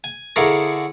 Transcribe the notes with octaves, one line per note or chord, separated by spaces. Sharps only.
G#5
D3 E4 F4 G#4 A#4 C#5